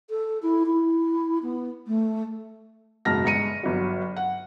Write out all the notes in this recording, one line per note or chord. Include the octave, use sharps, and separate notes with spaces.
A4
E4
E4
B3
A3
F#1 G#2 B2 A5 F6 A#6
G1 G#3 A#5 C#7 D#7
G1 F#3
F#5